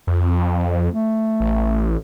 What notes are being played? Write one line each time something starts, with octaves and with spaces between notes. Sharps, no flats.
F2
A3
A1